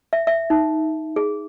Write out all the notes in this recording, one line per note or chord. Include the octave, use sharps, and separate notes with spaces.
E5
E5
D#4
G#4